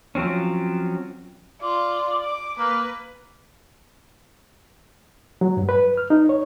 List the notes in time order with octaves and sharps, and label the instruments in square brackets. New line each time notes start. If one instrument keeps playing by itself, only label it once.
[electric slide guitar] F3 F#3 C4 C#4
[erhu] F4 [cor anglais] D5
[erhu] D6
[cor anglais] A#3 [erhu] B4
[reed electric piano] F#3
G2
B4
F6
D#4
C#5